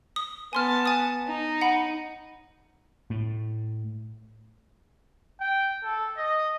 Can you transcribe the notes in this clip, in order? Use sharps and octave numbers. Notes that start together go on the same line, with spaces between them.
D#6
B3 G#5 A5 C6 F6
G#5 D#6
D#4
F#5 B5
A2
G5
A4
D#5